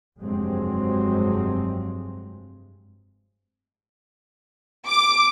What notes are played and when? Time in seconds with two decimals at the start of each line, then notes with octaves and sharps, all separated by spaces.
0.19 F1 G2 F#3 G#3 C4
4.88 D6